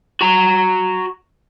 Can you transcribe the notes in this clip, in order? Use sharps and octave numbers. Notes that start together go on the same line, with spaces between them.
F#4 A#5